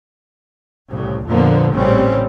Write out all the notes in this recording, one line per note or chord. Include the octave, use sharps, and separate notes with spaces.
C2 A2 C#3
F2 A#2 D3 F3 A#3 B3
A1 C#3 G3 C4 C#4